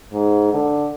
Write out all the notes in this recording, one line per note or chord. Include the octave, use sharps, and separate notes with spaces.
G#2
D3